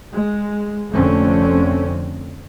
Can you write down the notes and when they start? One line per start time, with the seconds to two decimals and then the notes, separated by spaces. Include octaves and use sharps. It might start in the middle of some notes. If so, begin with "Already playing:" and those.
0.13 G#3
0.91 F1 F2 D3 A3 C4 C#4